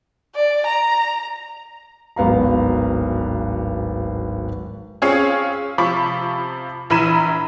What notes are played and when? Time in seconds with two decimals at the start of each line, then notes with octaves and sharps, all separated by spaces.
0.35 D5
0.67 A#5
2.16 D1 G#1 B3 F5 A#5
5.02 C4 C#4 F4 G#4 C#5 F5
5.78 C3 F3 B5 C#6 D6
6.90 A#1 E3 A#5 B5 D#7 E7